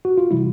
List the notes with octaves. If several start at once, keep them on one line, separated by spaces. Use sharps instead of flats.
F#4
F4
C3 E3 G3 E4